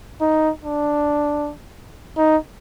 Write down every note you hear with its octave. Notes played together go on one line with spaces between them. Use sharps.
D#4
D4
D#4